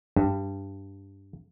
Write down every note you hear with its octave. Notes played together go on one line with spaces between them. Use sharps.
G2